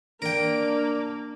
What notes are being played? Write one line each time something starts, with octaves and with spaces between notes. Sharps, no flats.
A#3 D4 A#4 G5